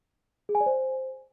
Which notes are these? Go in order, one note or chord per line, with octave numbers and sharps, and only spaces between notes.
G#4
G#5
D5
C5